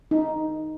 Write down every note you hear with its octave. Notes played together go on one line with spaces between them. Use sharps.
D#4